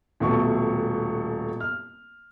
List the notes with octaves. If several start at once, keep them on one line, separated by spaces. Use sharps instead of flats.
D#1 B2 A3 C#6
F6